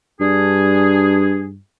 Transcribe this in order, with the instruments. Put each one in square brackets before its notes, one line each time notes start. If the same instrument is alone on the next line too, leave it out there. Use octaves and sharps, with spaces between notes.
[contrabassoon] G2 [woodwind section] D4 G#4